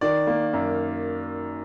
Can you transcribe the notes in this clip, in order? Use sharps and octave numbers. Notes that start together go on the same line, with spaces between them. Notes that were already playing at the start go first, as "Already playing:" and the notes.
D#3 D5
A#3
F#2